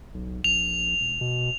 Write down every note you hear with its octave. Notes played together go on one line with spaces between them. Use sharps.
B1
A#1 F7
E1
B2